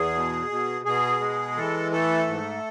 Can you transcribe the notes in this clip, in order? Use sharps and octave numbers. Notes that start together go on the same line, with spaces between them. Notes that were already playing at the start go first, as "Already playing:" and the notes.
Already playing: E2 G#4
B2
B2
B2 G#4
G#3
E3 A4
A3 A4
G#2